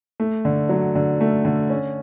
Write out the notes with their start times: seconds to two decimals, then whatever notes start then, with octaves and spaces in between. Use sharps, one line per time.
0.20 A3
0.45 D3
0.69 F#3
0.95 D3
1.21 A3
1.45 D3
1.70 C#4